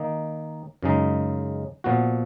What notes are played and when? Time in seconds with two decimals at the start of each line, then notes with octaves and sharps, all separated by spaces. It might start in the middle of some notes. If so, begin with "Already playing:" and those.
Already playing: D#3 A#3 D#4
0.83 F#2 C#3 G#3 D#4
1.84 A#2 F3 B3 F#4